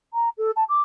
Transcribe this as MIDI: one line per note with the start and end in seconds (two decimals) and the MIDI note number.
0.13 0.29 82
0.38 0.51 69
0.56 0.64 81
0.69 0.82 86